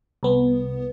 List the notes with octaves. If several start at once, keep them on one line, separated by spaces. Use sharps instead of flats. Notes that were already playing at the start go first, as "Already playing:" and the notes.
C2 B3